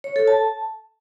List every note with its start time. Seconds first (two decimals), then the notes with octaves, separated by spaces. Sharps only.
0.04 C#5
0.16 A4
0.27 A5